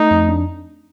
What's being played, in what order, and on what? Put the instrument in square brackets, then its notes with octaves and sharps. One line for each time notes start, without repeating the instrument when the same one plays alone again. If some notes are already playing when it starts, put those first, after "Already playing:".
Already playing: [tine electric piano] A3 [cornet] D#4
[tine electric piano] F2
D4